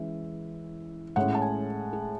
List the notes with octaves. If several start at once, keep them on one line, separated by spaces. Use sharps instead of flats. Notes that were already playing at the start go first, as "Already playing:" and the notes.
Already playing: E3 G#3 C#4 E5
A2 G#3 C#4 F#5
A5
G#5
G#4